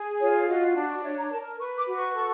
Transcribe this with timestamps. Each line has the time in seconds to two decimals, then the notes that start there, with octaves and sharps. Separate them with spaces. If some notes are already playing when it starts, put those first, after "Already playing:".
Already playing: G#4
0.21 F4 C#5
0.49 F#4 D#5
0.76 D4
1.04 C#5 E5
1.18 A#5
1.31 A#4 A5
1.59 B4 C#6
1.77 D6
1.87 F#4
1.96 C#6
2.14 A4